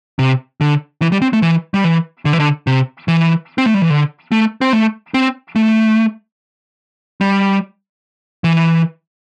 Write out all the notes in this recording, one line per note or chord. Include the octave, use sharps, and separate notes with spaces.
C3
D3
E3
G3
C4
A3
E3
G3
E3
D3
E3
D3
C3
E3
C4
A3
G3
E3
D3
A3
C4
A3
C4
A3
G3
E3